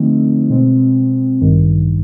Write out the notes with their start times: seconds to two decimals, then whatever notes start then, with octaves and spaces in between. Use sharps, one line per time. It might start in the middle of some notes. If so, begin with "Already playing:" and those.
Already playing: D3 F3 A3 C4 D#4
0.50 B2 G#3 C4
1.41 A1 G2 D#3